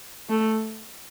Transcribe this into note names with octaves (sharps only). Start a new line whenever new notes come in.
A3